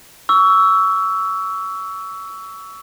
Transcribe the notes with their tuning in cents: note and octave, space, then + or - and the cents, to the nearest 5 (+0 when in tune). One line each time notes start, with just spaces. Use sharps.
C#6 +30 E6 +0